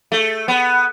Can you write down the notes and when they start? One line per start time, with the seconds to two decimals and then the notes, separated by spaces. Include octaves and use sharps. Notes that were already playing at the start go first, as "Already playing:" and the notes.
0.12 A3
0.48 B3